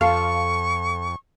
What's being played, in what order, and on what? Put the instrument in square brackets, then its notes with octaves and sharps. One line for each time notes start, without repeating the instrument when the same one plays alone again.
[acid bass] F2 [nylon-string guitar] F4 A4 [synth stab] F5 [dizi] C#6